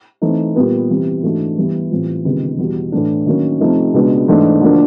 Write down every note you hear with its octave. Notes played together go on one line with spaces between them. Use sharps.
E3 A3 C4 D#4
A#2 G3 B3
C3 E3 G3 B3
G#2 E3 A3 D4 F#4
G2 E3 G3 B3
A2 E3 G3 C4 F4
C#2 C3 D#3 G3 B3
E2 B2 G3
A2 E3 A3 D4
D#3 F#3 A#3 C#4
C3 F3 A3 C4 D#4
C#2 B2 G#3 B3 D4
G#2 E3 A3 D4
D2 D3 F3 A#3 D4